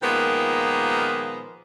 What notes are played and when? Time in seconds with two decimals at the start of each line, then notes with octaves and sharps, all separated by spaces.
0.03 A#2 D#3 F3 G#3 A#3 B3